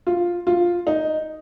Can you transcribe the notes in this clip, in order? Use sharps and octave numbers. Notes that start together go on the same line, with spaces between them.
F4
F4
D#4